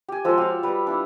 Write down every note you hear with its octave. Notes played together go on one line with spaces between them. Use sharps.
G4 G#5
F3 G#3 A4 C5
F#4 G4 C#5 F5
G3 B4
D4 E4